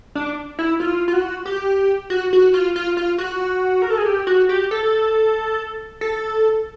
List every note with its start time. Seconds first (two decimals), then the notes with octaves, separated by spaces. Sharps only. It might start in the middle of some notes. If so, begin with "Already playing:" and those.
0.15 D4
0.59 E4
0.80 F4
1.08 F4
1.13 F#4
1.46 G4
2.10 F#4
2.33 F#4
2.54 F4
2.76 F4
2.97 F4
3.18 F#4
3.82 A#4
3.90 A4
3.98 G#4
4.06 G4
4.27 F#4
4.49 G4
4.71 A4
6.01 A4